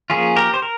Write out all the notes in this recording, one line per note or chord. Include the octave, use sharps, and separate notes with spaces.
F3 A#3 C#4 F4 G#4
G4 A#4
C5
A#4